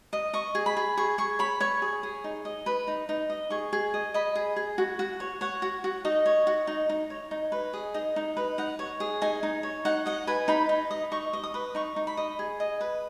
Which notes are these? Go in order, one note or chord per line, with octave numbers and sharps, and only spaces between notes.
D#5
D#5 C#6
G#4
B5
G#4
G#4 C#6
G#4 C#6
C#5 B5
C#5 C#6
G#4
G#4
D#4
D#5
B4
D#4
D#4
D#5
G#4 C#6
G#4
D#5
D#5 B5
G#4
G#4
F#4
F#4
C#5
C#5 F#5
F#4
F#4
D#4 D#5
C#5
F#4
D#4
D#4
C#5
D#4
B4
G#4
D#4 D#5
D#4
B4
D#4 F#5
C#5
G#4
D#4 G#5
D#4
C#5
D#4 F#5
D#5 F#5
B4 G#5
D#4 B5
D#4
D#5
D#4 C#6
D#5
D#6
B4
D#4 C#6
D#4
B5
D#5
G#4
D#5
B4